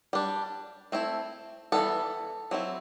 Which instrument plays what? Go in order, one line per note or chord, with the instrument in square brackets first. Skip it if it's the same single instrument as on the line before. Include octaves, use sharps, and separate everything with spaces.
[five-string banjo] G3 D4
A3 C4 E4
E3 G3 B3 A4
F#3 C4 E4